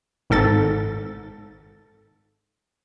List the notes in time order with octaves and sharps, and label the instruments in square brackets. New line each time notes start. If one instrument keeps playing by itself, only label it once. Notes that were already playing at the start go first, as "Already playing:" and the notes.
[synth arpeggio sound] G#1 G#2 A4 A6